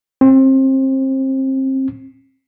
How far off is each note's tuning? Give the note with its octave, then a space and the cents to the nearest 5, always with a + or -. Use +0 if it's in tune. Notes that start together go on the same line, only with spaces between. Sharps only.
C4 +30